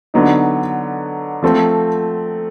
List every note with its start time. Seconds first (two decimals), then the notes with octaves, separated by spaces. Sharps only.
0.14 D3 F#3 B3 D#4
1.43 F3 A3 C4